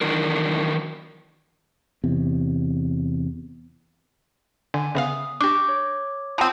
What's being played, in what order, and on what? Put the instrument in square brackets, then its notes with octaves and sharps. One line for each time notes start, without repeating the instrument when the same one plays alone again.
[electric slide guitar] D#3 E3 F#3 D4 A#4
[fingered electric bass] E2 C3
[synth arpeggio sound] D3 [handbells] G#5
[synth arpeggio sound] C#3 B3 F5 [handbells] E5 D#6
[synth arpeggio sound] D4 G4 [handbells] C#6 G6 A#6 [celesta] D6
[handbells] C#5
[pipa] F3 C4 [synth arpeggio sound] A#5